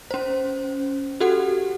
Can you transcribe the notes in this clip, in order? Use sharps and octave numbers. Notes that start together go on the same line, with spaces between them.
C#4 C5
F#4 G4 A4 F#5